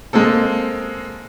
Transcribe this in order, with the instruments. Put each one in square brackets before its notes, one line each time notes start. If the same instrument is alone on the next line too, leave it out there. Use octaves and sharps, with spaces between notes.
[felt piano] G#3 A#3 C4 A4